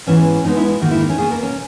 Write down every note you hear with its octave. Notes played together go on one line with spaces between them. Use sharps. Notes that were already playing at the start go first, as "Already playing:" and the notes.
G#2 E3 B3 C#4
B2 G#3 B3 D#4
E4
E4
G#2 D#3 A#3 F#4
E4
D#4
C#4
B2 A#3 G#4
A#4
C#4